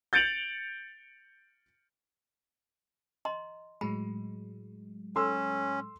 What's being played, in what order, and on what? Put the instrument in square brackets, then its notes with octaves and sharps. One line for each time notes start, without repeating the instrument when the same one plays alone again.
[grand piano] G6 A6 C#7 D7 F7 F#7
[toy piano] D#5 A#5 C6
[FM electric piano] A2 F#3 G#3 [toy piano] B5
[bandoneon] C#4 [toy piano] A4 [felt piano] C6 E6